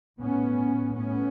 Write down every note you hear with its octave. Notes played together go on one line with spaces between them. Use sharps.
A2 B3 C#4
A2 B3 C#4